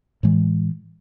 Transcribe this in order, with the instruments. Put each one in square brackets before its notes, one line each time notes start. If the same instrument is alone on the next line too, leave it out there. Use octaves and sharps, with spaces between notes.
[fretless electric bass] A2 E3 G#3